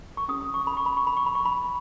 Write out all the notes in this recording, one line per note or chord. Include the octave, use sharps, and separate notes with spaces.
C#6
C#4 G4 C#5 D#6
D#6
C#6
B5
C#6
B5
C#6
B5
C#6
B5
C#6
B5